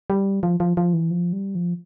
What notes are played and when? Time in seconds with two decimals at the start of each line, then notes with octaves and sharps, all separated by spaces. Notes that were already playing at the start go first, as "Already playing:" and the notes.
0.10 G3
0.43 F3
0.60 F3
0.77 F3
0.93 E3
1.11 F3
1.33 G3
1.55 F3